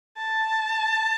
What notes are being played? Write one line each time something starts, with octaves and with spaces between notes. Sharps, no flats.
A5